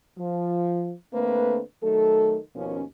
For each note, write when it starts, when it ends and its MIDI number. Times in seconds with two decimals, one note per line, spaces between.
0.18 0.92 53
1.14 1.61 50
1.14 1.61 57
1.14 1.61 58
1.14 1.61 60
1.14 1.61 71
1.83 2.37 51
1.83 2.37 54
1.83 2.37 57
1.83 2.37 69
2.55 2.82 39
2.55 2.82 47
2.55 2.82 53
2.55 2.82 58
2.55 2.82 61